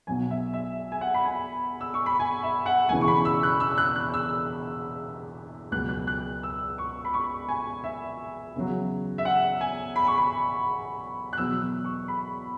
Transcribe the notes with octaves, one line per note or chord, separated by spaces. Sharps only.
B1 B2 F#3 G#5
E5
E5
G#5
F#5
B5
G#5
E6
C#6
B5
G#5
E5
F#5
E1 E2 C#3 E3 G#5
C#6
B5
E6
F#6
E6
F#6
F#6
E6
C#2 B2 F#3 F#6
F#6
F#6
E6
C#6
B5
C#6
G#5
E5
E2 C#3 F#3
E5
F#5
G#5
B5
C#6
B5
F#6
E2 B2 F#3 E6
E6
C#6
B5